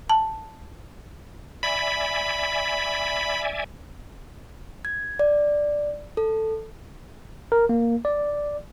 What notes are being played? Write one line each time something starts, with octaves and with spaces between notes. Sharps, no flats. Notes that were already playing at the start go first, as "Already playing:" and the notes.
A5
D5 E5 G#5 B5
G#6
D5
A4
A#4
A#3
D5